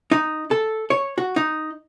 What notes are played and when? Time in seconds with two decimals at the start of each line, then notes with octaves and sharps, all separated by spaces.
0.12 D#4
0.51 A4
0.90 C#5
1.18 F#4
1.36 D#4